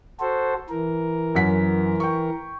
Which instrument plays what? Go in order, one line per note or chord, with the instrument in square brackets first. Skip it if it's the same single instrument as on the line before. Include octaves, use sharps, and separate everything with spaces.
[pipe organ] F#4 A4 C5
E3 A#4
[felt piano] F#2 F#5 B6
G5 C#6